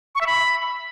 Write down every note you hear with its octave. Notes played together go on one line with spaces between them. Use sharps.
C#6
E5
B5